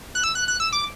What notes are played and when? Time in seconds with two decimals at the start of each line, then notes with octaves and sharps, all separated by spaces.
0.15 F#6
0.24 E6
0.35 F#6
0.48 F#6
0.60 E6
0.72 D6